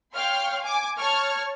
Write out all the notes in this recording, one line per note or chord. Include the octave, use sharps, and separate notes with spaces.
C#5 F5 G5 C6 F6
G#5 D6
C#5 A5 C#6 F6 G#6